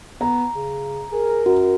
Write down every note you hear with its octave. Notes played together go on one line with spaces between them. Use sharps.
B3 A#5
C#3
G#4 A#4
F#2 F#4